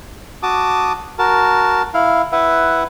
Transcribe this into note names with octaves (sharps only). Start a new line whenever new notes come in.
F#4 A5 D6 D#6
F#4 A#4 A5
E4 F5
E4 B4 E5 F#5